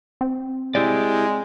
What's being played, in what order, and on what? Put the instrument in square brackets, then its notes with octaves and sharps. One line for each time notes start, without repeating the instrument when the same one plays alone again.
[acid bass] C4
[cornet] G#3 [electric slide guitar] E4 G4 D5